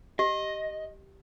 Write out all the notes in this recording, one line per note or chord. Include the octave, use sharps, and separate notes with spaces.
G4 D#5